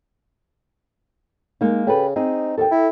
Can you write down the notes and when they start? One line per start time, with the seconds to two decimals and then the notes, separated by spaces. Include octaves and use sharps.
1.61 G#3 A#3 D#4
1.87 C#3 G4 A4 B4
2.16 C4 D#4 G#4
2.58 D#2 A4 G5
2.71 E4